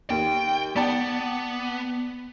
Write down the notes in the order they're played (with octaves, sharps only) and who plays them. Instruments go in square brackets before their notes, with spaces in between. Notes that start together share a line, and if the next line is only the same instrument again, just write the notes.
[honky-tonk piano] D#2 [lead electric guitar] G5
[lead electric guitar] B3 [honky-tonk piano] D5 G5 A5